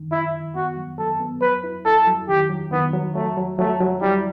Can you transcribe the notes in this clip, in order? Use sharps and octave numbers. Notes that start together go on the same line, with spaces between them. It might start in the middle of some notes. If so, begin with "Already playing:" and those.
Already playing: F#2 D#3
F#2 E4
D#3
B3 F#4
F#3
F#3 A4
B3
F#3 B4
E4
E4 A4
F#3
D#3 G4
F#3
D#3 B3
F#3
F#3 A3
F#3
F#3 A3
F#3
G3 E4